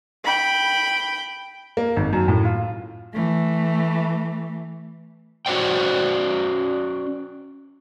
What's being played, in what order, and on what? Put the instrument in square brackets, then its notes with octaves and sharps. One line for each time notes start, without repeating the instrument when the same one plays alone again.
[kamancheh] G5 B5
[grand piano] A#3
G#1
F#2
A2
F4
[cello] E3 A3
[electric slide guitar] C#4 F#4 C5 D5 G5